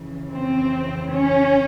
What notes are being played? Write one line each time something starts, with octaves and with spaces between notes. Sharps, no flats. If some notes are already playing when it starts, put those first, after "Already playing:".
Already playing: F2 C#3 E3
C4
C#4